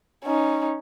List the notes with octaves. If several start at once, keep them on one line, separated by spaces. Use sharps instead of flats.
C#4 D#4